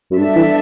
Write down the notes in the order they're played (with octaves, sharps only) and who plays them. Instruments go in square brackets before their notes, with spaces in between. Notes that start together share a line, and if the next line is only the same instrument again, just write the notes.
[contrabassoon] F#2
[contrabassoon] G2 [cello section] G3 B3 D4 A4 E5
[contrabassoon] E3